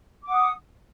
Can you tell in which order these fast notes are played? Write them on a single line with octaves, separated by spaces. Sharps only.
D6 F#5 D#6